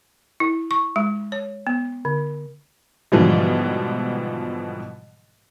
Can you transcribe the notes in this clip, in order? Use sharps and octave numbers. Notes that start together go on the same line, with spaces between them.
E4
C#6
G#3
C#5
B3
D3
G#2 B2 D3 E3 F3 G3